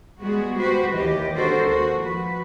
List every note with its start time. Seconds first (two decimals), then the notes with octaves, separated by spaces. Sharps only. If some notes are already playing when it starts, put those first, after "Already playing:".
0.21 G3 G#3 B3 F#4 G#4
0.60 F#4 G4 B4 C5
0.92 D#2 E3 G4 D#5
1.35 D4 F#4 A4 A#4 C5
1.66 D#2 F#4
2.01 F3 F#4 B4